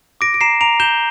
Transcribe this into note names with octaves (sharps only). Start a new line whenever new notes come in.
D6 A#6 D7
D7
A#5 C7 E7
A#5 D7 F7
G6 E7 G7